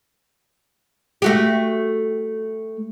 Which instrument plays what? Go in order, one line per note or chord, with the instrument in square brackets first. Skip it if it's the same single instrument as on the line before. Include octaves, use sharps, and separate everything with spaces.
[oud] A3 F#4 G4